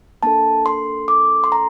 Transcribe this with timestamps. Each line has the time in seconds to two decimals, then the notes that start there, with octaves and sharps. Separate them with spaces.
0.23 A#3 D4 A4 A5
0.66 C6
1.08 D6
1.44 C6
1.52 A#5